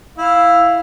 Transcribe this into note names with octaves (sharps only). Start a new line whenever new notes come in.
E4 F5